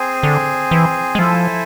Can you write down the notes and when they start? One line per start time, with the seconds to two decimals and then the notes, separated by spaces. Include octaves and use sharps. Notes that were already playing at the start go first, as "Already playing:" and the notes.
Already playing: C4 G#4 C5 G#5
0.23 D3
0.71 E3
1.15 G#3
1.19 F3 E4 A4 C5 E5 G#5